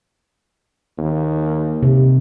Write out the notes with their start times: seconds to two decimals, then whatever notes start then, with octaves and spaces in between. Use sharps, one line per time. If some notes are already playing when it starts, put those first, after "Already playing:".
0.98 D#2
1.83 C3